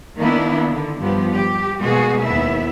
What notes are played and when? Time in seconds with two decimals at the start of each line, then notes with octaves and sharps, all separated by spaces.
0.17 D#3 A#3 B3 D4 E4
0.68 D3
1.01 G2 F3 B3 G4
1.34 G4
1.78 B2 G#3 A#3 F#4 G#4
2.23 D#2 B3 E4 E5